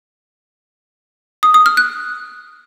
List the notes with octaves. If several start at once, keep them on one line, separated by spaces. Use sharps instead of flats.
D#6
D#6
F6
F#6